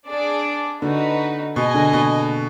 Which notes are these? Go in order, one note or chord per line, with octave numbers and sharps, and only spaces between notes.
D4 G#4 D5
D3 D#4 F#4 B4
B2 G#4 D#5 G#5
D3
B2